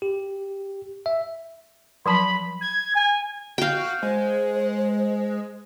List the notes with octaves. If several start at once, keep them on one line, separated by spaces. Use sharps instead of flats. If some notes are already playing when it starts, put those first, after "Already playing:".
G4
E5
F3 F#3 A5 B5
G#6
G#5
F#4 F5 G5
G#3 C5